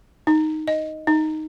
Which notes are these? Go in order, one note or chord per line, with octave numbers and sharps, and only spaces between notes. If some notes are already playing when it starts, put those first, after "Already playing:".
D#4
D#5
D#4